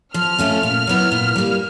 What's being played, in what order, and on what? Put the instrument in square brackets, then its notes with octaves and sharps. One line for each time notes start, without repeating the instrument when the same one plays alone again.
[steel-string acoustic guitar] F3 [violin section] F6
[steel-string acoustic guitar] A3 C#4 F4
[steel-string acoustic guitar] A#2 [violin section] F6
[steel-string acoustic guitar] F#3 B3 E4
A#2
G3 A#3